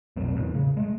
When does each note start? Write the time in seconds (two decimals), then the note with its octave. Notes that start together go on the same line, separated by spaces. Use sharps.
0.16 F1 B1 F#3 C4
0.37 E2 A2
0.55 C#3
0.77 G#3 A3